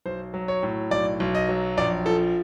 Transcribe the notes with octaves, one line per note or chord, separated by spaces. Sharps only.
B1 C5
F#3
C#5
A2
B1 D5
B1
D#5
F#3
A#1 D5
F3 A4